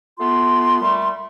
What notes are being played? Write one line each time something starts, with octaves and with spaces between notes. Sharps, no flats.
A3 B3 F4 C6
A#2 G3 A3